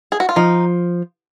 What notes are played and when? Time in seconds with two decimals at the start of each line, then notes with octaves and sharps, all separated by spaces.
0.12 G#4
0.20 F#4
0.29 F4
0.36 F3 D#4